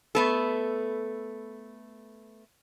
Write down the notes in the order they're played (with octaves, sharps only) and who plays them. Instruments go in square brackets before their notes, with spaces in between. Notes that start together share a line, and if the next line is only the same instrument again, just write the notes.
[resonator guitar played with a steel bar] A3 B3 A4